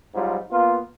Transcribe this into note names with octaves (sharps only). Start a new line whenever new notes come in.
G#2 F#3 G3 C4 F4
A#3 B3 F4